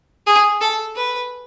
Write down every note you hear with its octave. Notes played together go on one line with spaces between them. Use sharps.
G#4
A4
B4